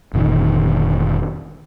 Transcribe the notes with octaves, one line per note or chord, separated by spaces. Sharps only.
F1 A#2 D3 D#3